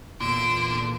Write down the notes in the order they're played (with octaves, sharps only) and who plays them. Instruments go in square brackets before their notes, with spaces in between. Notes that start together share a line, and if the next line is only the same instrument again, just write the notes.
[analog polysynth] E2 A#2 [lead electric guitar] D3 [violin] D7 E7